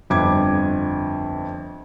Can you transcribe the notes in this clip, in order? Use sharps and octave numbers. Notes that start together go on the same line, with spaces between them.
G1 F2 D6 G#6